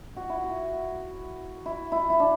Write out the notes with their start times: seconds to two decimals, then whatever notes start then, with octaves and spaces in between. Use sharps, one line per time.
0.16 F#4
0.30 E4
0.44 F#4
1.66 E4
1.92 E4
2.10 E4
2.20 D4